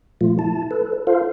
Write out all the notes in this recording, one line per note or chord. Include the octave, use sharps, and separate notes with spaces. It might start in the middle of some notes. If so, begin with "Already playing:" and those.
A#2 F3 A3 F4
E4 A5
A4 B4
F4 A4 C5 F5